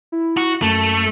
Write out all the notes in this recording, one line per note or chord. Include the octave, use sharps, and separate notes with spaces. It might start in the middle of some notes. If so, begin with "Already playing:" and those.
E4
F#4
F#2 A3